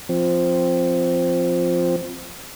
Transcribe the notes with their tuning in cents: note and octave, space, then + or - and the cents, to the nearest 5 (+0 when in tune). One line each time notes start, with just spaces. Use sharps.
F3 +0 C4 +0